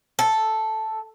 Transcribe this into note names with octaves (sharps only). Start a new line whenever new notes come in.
A4